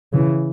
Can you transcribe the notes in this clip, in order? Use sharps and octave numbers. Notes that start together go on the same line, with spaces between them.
C#3 E3